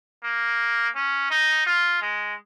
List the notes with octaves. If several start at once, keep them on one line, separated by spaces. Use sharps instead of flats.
A#3
C#4
D#4
F4
G#3